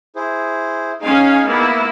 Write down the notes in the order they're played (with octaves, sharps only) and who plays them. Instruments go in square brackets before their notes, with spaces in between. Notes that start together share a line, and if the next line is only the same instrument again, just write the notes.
[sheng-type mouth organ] E4 G#4 C5
[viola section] C#4 F5 G#5 [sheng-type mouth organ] D#4 G#4
[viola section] A#3 B3 E4